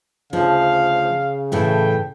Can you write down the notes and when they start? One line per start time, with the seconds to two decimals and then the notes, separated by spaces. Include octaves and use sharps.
0.33 D2 C#3 F3 F5
1.52 A2 E3 A3 G5